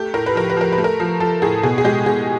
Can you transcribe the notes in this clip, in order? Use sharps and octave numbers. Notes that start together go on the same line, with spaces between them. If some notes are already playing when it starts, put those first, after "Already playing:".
Already playing: A3 G4
A2 A#4
B4
F3 A#4
B4
F3 A#4
B4
A3
A#4
F3
F3 A4
A2 G#4
B2 G#4
G#4
G#3 G4
B2 G#4